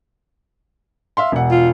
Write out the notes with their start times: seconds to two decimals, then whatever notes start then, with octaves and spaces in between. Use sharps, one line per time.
1.17 E5 F5 C6
1.32 E1 F#5
1.51 F4